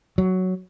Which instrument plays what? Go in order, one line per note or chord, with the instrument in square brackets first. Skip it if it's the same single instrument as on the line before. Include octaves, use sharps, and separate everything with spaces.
[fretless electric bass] F#3